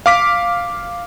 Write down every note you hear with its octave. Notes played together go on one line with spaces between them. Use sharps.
F5 D6 B6